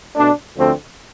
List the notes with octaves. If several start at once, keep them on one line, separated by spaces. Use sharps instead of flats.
B2 A3 D4
D2 D3 F3 A3 C4